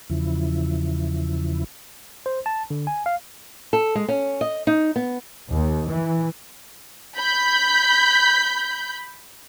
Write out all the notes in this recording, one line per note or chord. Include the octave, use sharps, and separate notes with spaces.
E2 C#3 F3 E4
C5
A5
D3
G#5
F5
A4
G#3
C#4
D#5
D#4
B3
D#2
E3
B5 G6